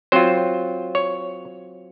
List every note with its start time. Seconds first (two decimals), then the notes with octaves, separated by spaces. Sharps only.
0.12 F#3 C4 F4 C5
0.95 C#5